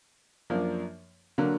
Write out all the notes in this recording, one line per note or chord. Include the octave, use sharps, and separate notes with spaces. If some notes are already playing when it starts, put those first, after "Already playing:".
F#2 F3 A#3 D4
D3 F#3 A#3